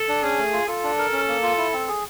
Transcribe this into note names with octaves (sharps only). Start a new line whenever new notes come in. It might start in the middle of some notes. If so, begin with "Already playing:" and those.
Already playing: A4
D4
C#4 G#4
A3
F4
F4 A4
D4
A#4
C#4
A#3
F4
E4
C4
G#4